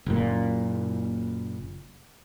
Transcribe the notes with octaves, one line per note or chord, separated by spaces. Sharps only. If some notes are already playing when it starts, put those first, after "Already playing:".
F#1 A#2